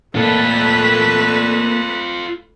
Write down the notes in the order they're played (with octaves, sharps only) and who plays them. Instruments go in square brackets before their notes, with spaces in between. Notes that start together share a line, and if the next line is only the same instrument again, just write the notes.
[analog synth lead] A#2 [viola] A3 B4 [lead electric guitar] F4 A4